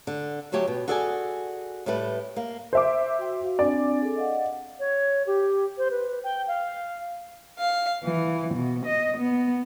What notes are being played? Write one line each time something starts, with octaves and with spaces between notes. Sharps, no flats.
D3
D3 F#3 A3 G4 C#5
B2
F#4 G#4 A4 D5 F5 G#5
A2 G3 A3 B4
A#3
C5 E5 D6
F#4 G5
F#4 F5
C4 D4 D5 G#5
G#4 A4
D#5 F5 F#5
C#5
G4
C5
B4
G5
F5
F5
E3
B2
D#5
B3